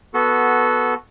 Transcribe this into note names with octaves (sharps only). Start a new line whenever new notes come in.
B3 F#4 A4